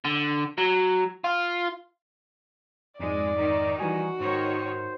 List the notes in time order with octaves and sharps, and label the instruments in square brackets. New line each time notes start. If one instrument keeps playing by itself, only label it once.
[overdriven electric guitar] D3
F#3
F4
[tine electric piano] F2 G#2 [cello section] G#3 [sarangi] D5
[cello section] D#3 D#4
[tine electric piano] E3 G3 G#5 [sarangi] F#4
[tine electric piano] G#2 [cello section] D#3 C#5 [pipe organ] C5